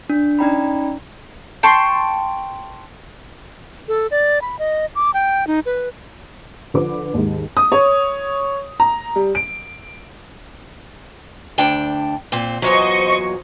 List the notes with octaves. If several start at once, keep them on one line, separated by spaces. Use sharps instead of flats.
D4
C#4 D#4 D5 G5 A#5 B5
G5 A5 C6 C#6
A4
D5
B5
D#5
D6
G5
D#4
B4
D3 F3 B4 D6
D#2 G#2
D#6
C#5
A#5
G3
D7
D2 D4 G5
A#2 C4
E2 A#2 F#3 C5 D#5 C#6